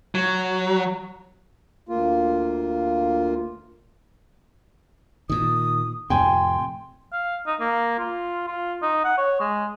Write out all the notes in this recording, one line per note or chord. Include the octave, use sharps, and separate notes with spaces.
F#3
D2 A#3 F4
A#2 D#3 D#6
F2 A2 C3 G5 G#5 C6
F5
D#4
A#3
F4
F4
D#4
F#5
C#5
G#3